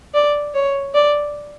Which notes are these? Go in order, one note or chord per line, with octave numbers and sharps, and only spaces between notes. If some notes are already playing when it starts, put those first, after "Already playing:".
D5
C#5
D5